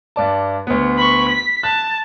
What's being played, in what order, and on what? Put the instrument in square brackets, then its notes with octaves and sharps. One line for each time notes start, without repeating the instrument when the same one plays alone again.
[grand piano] G2 D5 A5
D2 B3
[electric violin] B5 C#6
B6
[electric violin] A5 [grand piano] F#6